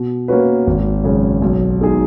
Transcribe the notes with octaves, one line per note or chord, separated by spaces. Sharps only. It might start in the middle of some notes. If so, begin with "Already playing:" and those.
Already playing: B2
A#3 C#4 F#4 B4
G#1
F#2 C#3 G#3 C#4
B1
B2 G#3 D#4 G#4